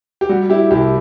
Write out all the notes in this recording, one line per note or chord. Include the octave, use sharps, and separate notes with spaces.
G4
G3 F#4
E4 G4
C2 E4 G4